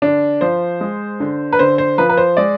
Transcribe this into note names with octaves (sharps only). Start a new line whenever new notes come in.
D3 D4
F3 C5
G#3
D3
B4
D3 C5
C5
F3 B4
B4
C5
G#3 D5